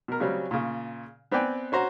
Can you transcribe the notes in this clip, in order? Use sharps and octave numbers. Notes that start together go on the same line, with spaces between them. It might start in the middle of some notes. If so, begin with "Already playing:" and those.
B2 A#4
C#3 F#3 G3 C4 C#4
A#2 C#3
B3 C4 B4 D5 G5 G#5
C#4 F#4 C5 A#5